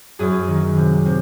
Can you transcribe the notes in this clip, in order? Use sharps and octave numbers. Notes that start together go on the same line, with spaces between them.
F#2 G#4
D#3
C3
C3